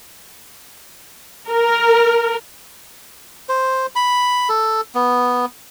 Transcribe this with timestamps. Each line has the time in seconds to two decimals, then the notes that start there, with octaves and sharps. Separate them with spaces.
1.49 A#4
3.49 C5
3.95 B5
4.49 A4
4.95 B3